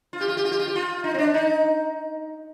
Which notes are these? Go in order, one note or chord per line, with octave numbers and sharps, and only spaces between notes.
F4
G4
F4
G4
F4
G4
F4
G4
F4
D#4
C4
D4
D#4